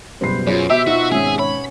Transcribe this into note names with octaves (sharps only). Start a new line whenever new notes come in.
F#1 B2 G3 B4 C5 C7
F#2 F4 G#4 C#5
B2 G4 E5
D#4 F4 F#4 F#5
G#1 C#4 G#4
C#5 B5